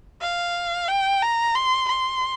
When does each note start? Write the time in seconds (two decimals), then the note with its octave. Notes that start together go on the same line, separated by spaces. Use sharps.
0.21 F5
0.88 G5
1.22 A#5
1.55 C6
1.89 C6